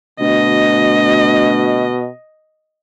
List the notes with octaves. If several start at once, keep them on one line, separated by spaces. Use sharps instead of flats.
D2 B2 D#5